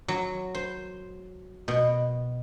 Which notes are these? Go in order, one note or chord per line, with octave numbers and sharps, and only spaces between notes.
F#3
C5
B2